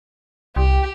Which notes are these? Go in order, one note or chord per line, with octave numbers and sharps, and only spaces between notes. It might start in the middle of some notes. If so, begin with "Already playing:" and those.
C2 G4